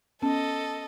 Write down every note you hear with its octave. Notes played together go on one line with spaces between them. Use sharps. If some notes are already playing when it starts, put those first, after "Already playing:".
B3 C#4 A4 D#5 A5